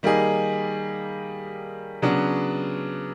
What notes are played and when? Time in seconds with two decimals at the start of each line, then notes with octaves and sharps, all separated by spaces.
0.03 D#3 G3 A#3 D#4 G#4
2.02 C#3 F#3 B3 D4